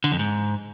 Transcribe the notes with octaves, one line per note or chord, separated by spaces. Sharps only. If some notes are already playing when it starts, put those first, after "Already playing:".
D3
F2
G#2